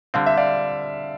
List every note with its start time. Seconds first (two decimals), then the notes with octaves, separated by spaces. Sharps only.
0.14 D3 G3 C4 F5
0.26 E5
0.37 D5 F5